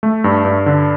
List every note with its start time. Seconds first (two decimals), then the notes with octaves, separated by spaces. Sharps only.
0.03 A3
0.24 G2
0.45 G2
0.66 D3